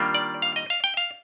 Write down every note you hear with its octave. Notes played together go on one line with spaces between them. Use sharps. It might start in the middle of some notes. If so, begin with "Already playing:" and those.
Already playing: D#3 G3 A#3 D4 F4
D5
F5
D#5
F5
G5
F5